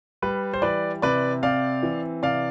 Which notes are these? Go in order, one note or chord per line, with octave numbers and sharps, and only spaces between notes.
G3 B4
C5
E3 B4 D5
C3 B4 D5
C4 D5 F5
E3
C3 D5 F5